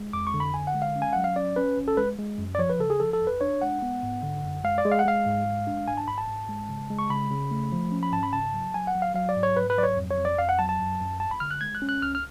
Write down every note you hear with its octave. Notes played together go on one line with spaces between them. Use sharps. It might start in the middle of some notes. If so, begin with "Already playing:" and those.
Already playing: G#3
F2 D6
C#6
D3
B5
D3 G#5
F#5
G#3
F5
C#4
G#5
F#3 F#5
F5
C#4 D5
C#4 B4
G#1
A4
G#3 B4
G#3
F#2
D5
F3 C#5
B4
C#3 A4
G#4
F3 A4
A4
F2
B4
D4 C#5
G#3 F#5
B3
G#2
D3
F#2
G#3 F5
D5
G#3
F5
F#5
G#3 F5
G#2
G#3
D4
G#2 G#5
A5
G#2 B5
A5
G#2
G#3
C#3
G#3
C#6
C#3 B5
C#3
A3
F3
C#4
B5
G#2 A5
B5
C#3 A5
F#3
F#3 G#5
F#5
F#3
F5
F#3 F5
D5
G#2
C#5
G#2 B4
B4
F#3 D5
C#5
F2
C#5
F2
D5
F2 F5
F#5
F#3 A5
A5
F#2
F#2
G#1 A5
B5
D3 F6
F#6
G#3 G#6
F#6
C#4
F#6
C#2 F6
F6